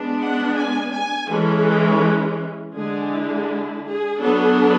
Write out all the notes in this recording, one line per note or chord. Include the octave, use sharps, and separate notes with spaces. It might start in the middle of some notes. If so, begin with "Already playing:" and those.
Already playing: G#3 B3 D4
F#5
G#5
G#5
E3 G#3 C#4 A4
D3 G#3 D4 G#4
E4
G#4
F#3 B3 D4 A4